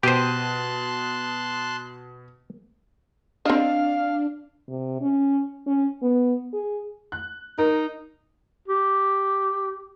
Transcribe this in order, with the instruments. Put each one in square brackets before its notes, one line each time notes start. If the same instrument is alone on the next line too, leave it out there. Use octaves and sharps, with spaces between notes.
[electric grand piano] B2 D#7 [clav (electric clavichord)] G4 C5 [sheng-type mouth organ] A5 C6 F#6
[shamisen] C4 D#5 [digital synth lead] D4 [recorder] F5
[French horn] C3
C#4
C#4
B3
G#4
[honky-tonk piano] F#6
[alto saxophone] D#4 [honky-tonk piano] A#4
[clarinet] G4